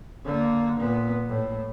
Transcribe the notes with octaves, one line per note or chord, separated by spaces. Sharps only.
D3 A#3
A#2 B3
A2